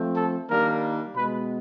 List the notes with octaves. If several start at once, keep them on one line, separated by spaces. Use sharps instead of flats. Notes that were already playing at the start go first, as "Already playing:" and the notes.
Already playing: F3 A3 C4
A4
D#3 G3 A#3 D4 A#4
B2 G#3 B3 B4